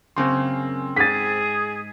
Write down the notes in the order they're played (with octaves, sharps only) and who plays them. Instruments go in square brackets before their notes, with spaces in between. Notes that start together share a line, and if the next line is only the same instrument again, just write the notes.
[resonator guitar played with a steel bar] F#2 C#3 A#3 [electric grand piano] C4 C6
[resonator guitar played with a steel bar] G#2 [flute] G#4 [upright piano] A6 B6